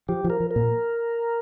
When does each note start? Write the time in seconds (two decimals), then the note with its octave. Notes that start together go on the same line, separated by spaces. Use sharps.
0.08 F3 G4
0.24 F3
0.30 A#4
0.40 F3
0.51 A#4
0.56 A#2